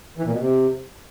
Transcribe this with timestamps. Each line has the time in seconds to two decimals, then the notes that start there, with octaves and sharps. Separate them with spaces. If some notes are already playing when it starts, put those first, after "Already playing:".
0.18 E3
0.25 A#2
0.31 B2
0.38 C3